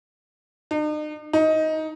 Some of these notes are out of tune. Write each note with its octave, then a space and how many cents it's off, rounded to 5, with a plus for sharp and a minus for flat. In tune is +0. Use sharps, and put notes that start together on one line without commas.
D#4 -45
D#4 +15